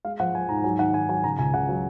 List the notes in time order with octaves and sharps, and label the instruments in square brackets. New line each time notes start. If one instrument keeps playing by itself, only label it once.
[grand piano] G#3 F5
F3 F#5
F3 G#5
G#2 A#5
F#3 G#5
D#3 F#5
D#3 G#5
F#3 G#5
C#3 A#5
C#2 G#5
C#3 F#5
F#3